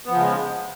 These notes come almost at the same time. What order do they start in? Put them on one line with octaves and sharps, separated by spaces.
B3 F3 C#3 G#3